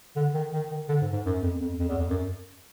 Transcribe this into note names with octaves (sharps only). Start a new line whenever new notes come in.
D3
D#3
D#3
D#3
D3
G#2
G#2
F#2
F2
F2
F2
E2
F2
F#2